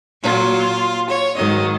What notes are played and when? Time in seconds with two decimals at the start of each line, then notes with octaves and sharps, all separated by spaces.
0.21 A#2 F#3 F4
1.08 C#5
1.35 G#2 D#3 F#3 D#5